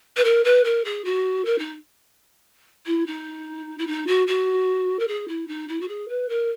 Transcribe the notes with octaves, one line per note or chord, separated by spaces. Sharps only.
B4
A#4
B4
A#4
G#4
F#4
A#4
D#4
E4
D#4
E4
D#4
F#4
F#4
A#4
G#4
E4
D#4
E4
F#4
G#4
B4
A#4